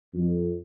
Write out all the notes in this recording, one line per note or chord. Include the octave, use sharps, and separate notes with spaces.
F2